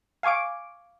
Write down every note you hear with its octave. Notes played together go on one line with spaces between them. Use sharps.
F5 G#5 C#6 D6 D7